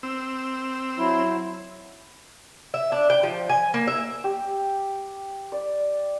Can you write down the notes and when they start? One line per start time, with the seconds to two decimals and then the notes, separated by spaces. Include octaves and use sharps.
0.03 C4 E6
0.98 F#3 E4
2.74 E5
2.92 D4
3.10 G5
3.23 F3
3.49 G#5
3.74 A#3
3.87 E5
4.24 G4
5.52 D5